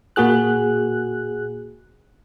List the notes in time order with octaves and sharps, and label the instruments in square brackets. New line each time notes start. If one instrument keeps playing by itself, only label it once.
[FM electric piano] A#2 A#3 F#4 G#4 F#6